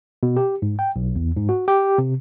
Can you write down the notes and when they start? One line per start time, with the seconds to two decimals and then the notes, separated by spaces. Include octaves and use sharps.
0.23 B2
0.36 G4
0.62 G#2
0.79 G5
0.96 B1
1.16 E2
1.36 G#2
1.49 F#4
1.68 G4
1.98 C3